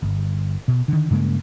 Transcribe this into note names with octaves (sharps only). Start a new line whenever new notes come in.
G1
B2
D3 D#3
G2 C#3 G#3 A#3